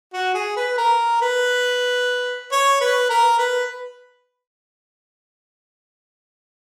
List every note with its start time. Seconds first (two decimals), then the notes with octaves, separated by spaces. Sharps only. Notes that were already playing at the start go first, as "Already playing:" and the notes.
0.13 F#4
0.34 G#4
0.57 B4
0.78 A#4
1.22 B4
2.52 C#5
2.81 B4
3.10 A#4
3.38 B4